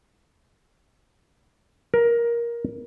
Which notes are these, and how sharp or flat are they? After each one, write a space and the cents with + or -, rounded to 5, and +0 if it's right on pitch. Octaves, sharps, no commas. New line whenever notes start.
A#4 +15